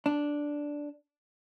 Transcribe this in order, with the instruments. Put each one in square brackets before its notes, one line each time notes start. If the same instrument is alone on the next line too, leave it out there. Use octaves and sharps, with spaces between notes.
[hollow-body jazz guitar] D4